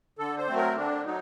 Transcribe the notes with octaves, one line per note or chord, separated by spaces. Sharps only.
D3 A4
C5
F#3 A3 C4
A#4
D3 D4
F#3 D#4